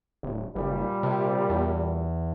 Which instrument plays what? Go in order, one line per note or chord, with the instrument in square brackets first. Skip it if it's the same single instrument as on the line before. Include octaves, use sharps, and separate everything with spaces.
[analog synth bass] D1
[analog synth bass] F#1 [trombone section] A#2 G3
[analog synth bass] C3
E2